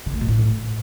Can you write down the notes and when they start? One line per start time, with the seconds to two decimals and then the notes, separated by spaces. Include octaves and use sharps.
0.06 C#3
0.14 A3
0.21 B2
0.28 A2